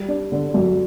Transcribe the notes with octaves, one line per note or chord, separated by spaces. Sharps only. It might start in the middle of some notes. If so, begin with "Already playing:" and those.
Already playing: G3
D4
D3
F#2